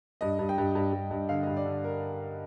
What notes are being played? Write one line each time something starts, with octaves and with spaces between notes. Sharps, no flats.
G2 D#5
G2
G5
G2
G2
G2
G2
D3 F5
G2 D#5
D5
D3
A#4